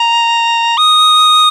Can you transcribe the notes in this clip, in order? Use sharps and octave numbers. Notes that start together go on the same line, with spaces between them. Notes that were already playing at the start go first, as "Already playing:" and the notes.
Already playing: A#5
D#6